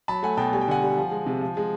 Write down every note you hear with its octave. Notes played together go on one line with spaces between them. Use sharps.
F#3 A5 B5
A3 F#5 G#5
B2 G5 A5
G3 G#5
G5
D3 F#5 G#5
G3
F3
G#3
C3
F3
G#3